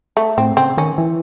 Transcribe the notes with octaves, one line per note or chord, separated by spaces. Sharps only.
A3
A2 C4
C#3 C4
D#3 C#4
E3